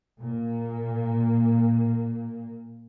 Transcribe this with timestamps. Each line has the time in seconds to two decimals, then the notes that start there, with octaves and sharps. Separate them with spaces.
0.20 A#2 A#3